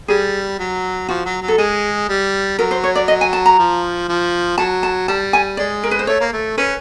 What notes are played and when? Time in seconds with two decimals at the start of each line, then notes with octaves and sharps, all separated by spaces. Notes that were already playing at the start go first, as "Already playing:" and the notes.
0.08 G3 G#4
0.59 F#3
1.09 F3 F#4
1.25 F#3
1.41 F#3
1.48 A4
1.58 G#3 G#4
2.08 G3
2.58 F#3 A#4
2.71 C5
2.84 C#5
2.95 D5
3.08 D#5
3.21 G#5
3.33 A5
3.46 A#5
3.58 F3
4.09 F3
4.58 F#3 A5
4.83 A5
5.08 G3 A5
5.33 G#5
5.57 G#3 D5
5.83 A#4
5.91 B4
5.99 C5
6.07 A3 C#5
6.20 A#3
6.33 A3
6.57 C#4 B4